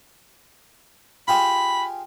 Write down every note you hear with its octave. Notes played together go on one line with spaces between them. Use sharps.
F4 G4 G#4 B5